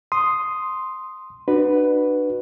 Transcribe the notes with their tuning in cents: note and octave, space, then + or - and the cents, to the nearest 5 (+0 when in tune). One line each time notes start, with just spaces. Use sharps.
C6 +0 D#6 +0
D4 +35 F#4 +0 B4 +0